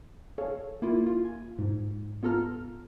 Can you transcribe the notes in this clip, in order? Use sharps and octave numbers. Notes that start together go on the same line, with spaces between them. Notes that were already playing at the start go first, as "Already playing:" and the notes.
G#4 A4 C#5 F5
A#3 E4 F4
F4
G#5
G#2
B3 F4 A4 A#5 F6